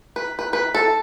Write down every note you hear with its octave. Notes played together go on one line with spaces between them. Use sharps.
B4
B4
B4
A4